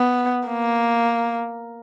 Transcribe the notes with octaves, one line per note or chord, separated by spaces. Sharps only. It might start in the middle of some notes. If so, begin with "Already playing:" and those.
Already playing: B3
A#3